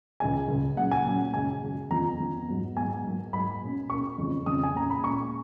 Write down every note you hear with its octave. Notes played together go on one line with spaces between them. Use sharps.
C#2 C#3 G#3 C#4 G#5
C#2 C#3 G#3 C#4
A#2 F#3 C#4 F#5
G#5
A#2 F#3 C#4
F#2 C#3 G#3 C#4 G#5
F#2 C#3 G#3 C#4
F2 F3 B3 A#5
F2 F3 B3
G#2 F#3 B3
G#2 F#3 B3 G#5
G#2 F#3 A#3
G#2 F#3 A#3 B5
B2 A#3 C#4
B2 A#3 C#4 C#6
F2 C#3 F3 G#3 C#4
F2 C#3 F3 G#3 C#4 D#6
G#5
A#2 G#3 C#4 A#5
B5
A#2 G#3 C#4 C#6